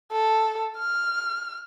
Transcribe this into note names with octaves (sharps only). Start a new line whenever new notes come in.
A4
F6